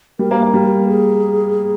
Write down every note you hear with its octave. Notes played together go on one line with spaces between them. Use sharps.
G3 A#4
A#3
A#3
G3
G#4